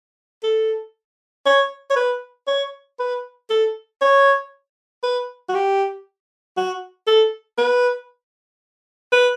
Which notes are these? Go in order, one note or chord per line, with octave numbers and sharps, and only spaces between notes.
A4
C#5
C#5
B4
C#5
B4
A4
C#5
B4
F#4
G4
F#4
A4
B4
B4